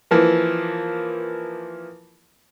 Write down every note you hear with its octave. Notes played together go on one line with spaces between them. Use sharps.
E3 F3 A#3